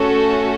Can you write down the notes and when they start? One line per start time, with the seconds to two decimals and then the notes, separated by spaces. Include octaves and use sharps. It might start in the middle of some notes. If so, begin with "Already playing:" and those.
Already playing: A3 C#4 F#4 A4